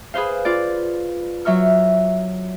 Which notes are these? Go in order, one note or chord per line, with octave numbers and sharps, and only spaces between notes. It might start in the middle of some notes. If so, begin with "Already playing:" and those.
G#4 B4 C5 F5
F4 D5
F#3 E5 C#6 F6